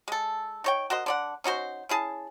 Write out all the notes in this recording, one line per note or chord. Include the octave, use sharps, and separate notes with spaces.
G#3 A4
D#4 C#5 G5
F#4 A#4 C5 D#5
D3 D5 F#5
C#4 D#4 F#4 C5
C#4 E4 G#4 A5